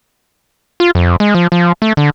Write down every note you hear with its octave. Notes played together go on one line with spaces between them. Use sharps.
F4
F2
G#3
F3
F3
A3
D3